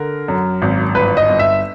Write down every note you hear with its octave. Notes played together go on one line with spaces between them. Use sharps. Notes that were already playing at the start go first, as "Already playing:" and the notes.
Already playing: D3 A#4
F#2
G#1
G1 B4
D#5
G1
E5